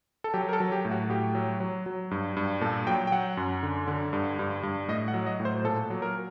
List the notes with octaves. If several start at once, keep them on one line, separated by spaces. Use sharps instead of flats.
A4
F#3 G4
A#4
A4
F#3
G4
A2
F#4
A2 G4
F#3
F#3
F#3
G2
G2
A#2 A4
F#3 G5
G5
F#3 F#5
F#2
D3
D3
G2
G2
G2
A2 D#5
F#5
F#3
D#5
A2
C5
A#2 A4
F#3
A#4